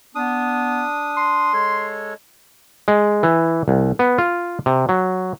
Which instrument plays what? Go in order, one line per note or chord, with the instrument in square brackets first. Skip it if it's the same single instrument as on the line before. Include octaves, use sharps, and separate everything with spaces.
[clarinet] B3 [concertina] D4 D#6
[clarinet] C6
[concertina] G#3 A4 C#5
[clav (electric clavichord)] G#3
E3
C2
B3
F4
C3
F#3